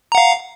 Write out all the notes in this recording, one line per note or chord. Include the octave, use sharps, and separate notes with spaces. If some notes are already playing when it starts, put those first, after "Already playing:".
F5 F#5 A#5